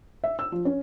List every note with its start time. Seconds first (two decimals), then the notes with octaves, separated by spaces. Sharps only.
0.24 E5
0.39 E6
0.52 F3
0.65 C#4